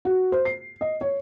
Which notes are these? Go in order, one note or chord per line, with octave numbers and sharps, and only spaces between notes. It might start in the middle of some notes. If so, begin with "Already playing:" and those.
F#4
C5
C7
D#5
C#5